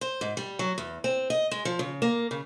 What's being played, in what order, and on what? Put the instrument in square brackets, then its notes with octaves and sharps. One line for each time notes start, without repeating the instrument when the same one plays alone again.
[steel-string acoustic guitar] C5
G#2
G3
F#3
E2
C4
D#5
G#3
F3
C#3
A#3
C#3